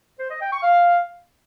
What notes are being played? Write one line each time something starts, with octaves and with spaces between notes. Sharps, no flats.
C5
D#5
G5
C#6
F5